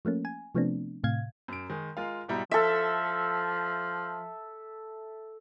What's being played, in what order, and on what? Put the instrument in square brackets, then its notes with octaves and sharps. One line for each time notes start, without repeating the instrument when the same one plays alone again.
[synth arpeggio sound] F3 A3 A#3 C#4
G#5
C3 F3 A3 B3 C4 D4
A2 C3 F5 G#6
[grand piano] F#2 D7
D#3 G#3
G#3 F4 A#4 F5
G#2 B2 G3 E4 A#5
[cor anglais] F3 [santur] A4 E5